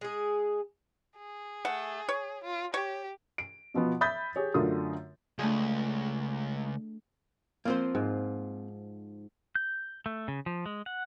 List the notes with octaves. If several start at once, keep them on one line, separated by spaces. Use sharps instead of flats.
G#3 G#4
G#4
A3 F#5
C#5
F4
G4 C#5
D7
B2 F3 B3
E5 B5 D#6 G6 A6 B6
G4 G#4 C#5
F#2 D3 A3 F4 A#4 D#6
C#2 A3 D4 G#4
F3 A#3 C4 F4 C5
G#2
G6
A3
C#3
F3
G#3
F#5